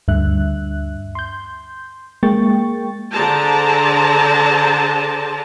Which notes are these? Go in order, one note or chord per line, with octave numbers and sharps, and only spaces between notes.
D2 G2 D3 E5 F#6
C6 G6
G#3 A#3 G5 C#6 A6
D3 G#4 C5 D5 A5 A#5